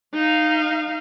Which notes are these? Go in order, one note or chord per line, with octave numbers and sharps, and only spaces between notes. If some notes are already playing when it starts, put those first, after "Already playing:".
D#4 F5